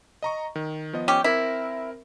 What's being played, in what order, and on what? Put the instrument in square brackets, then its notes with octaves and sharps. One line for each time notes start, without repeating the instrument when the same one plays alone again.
[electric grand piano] D#5 A#5 C#6
D#3
F3 B3 D#5
[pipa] C#4 G4
[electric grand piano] C4 A#4 [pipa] E4